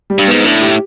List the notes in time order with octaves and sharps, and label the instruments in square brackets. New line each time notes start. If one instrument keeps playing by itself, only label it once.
[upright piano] G3
[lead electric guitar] G2
[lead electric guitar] G#2 [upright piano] B3
[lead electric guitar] A2 [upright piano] D4
[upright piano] G4